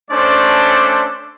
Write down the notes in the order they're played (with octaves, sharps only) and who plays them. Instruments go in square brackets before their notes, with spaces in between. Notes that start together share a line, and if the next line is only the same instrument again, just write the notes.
[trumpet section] A3 C#4 D4 A4 C5 D5